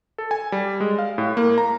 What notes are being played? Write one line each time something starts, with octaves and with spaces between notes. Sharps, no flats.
A4
G#5
G3
G#3
F5
A2
A#3
A#5